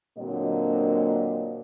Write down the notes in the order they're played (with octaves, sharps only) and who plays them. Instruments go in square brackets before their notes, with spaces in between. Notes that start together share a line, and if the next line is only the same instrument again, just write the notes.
[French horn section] A#2 D3 F#3 A#3 C4 D#5